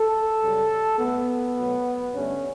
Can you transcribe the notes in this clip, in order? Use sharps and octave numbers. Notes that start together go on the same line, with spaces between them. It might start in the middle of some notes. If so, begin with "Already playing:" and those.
Already playing: A4
F#2 C#3 G3
B2 A3 B3
B2 F#3 A3
G2 D3 A3 C#4